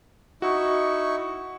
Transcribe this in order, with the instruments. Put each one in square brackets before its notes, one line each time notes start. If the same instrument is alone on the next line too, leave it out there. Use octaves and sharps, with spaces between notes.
[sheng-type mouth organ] D#4 E4 C#6 [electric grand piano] F#4